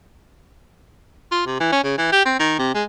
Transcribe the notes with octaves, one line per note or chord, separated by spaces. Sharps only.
F4
C3
E3
C#4
C#3
E3
G4
C4
D#3
C3
G#3